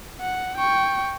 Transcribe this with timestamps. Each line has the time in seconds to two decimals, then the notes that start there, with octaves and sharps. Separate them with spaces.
0.21 F#5
0.57 G5 C#6